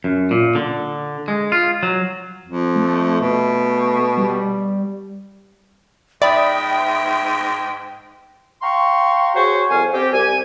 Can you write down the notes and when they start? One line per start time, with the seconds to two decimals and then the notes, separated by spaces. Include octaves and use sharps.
0.04 F#2
0.31 A#2
0.55 D3
1.28 G#3
1.52 F4
1.83 F#3
2.45 F2
2.76 A3
3.20 B2
4.18 G3
6.22 G#2 D5 E5 G5 B5 D#6
8.62 F5 G5 A#5 C6 C#6
9.35 F#4 G#4 C5 C#5 C#6
9.70 C2 F2 F5 G#5
9.94 C4 G4
10.13 C2 G#5